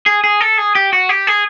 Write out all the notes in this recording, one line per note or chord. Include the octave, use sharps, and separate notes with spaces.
G#4
G#4
A4
G#4
G4
F#4
G4
G#4